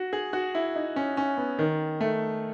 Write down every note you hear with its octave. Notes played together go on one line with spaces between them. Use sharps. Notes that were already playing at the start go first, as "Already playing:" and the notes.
Already playing: F#4
G#4
F#4
E4
D#4
C#4
C#4
B3
D#3
A3